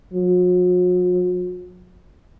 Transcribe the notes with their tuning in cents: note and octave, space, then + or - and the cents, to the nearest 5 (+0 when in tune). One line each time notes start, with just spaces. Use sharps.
F#3 -45